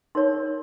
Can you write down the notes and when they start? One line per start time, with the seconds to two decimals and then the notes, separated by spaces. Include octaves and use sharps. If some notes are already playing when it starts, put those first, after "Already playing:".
0.15 D#4 A#4 C#5 C6